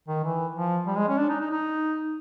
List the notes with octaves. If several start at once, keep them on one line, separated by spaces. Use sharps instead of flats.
D#3
E3
F3
G3
G#3
C#4
D4
D#4
D#4
D#4